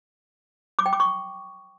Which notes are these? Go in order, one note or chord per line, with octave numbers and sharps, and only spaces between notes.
D6
G5
D6
C#6